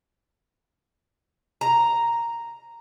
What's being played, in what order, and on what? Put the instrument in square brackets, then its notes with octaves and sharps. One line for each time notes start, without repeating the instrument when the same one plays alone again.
[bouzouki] A#5